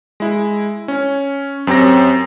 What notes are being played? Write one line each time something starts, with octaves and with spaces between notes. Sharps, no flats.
G#3 E4
C#4
F#2 C4 G4 C#5 A#6